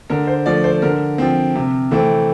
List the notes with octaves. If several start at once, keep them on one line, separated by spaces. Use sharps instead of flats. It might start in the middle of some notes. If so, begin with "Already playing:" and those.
D3 A#4
C5
F3 A3 D5
C5
D3 A#4
F3 C4
C3
E3 A3 C4